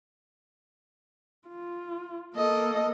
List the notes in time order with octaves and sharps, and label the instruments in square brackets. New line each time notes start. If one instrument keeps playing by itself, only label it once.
[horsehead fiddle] F4
[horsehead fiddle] A#3 A4 [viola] D#5